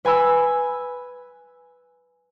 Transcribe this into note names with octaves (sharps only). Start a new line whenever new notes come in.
B4 G#5 B5 E6